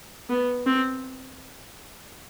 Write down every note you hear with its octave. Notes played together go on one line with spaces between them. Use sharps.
B3
C4